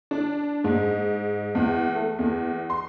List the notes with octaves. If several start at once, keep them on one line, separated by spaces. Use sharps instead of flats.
D4
G#2
E2
A3
E2
C6